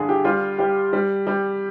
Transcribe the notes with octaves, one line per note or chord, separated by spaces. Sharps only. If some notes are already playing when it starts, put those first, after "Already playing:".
Already playing: G2 D3 G#4
G4
G3 F4
G3 G4
G3
G3